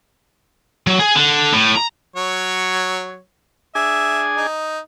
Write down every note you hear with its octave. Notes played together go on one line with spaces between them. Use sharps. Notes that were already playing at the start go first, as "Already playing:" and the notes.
F#3
G#4
D3
A2
A#5
F#3 C#5
D4 G#4 E5 G#5
D#4